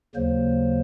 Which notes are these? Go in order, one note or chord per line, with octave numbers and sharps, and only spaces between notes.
D#2 C#3 F#3 A#3 C5